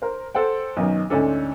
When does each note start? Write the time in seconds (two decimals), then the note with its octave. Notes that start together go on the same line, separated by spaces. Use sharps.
0.02 A#4 C5
0.35 A4 C5 F#5 G5
0.77 B1 F#2 D#3
1.10 D2 G#2 C#4 D4 A4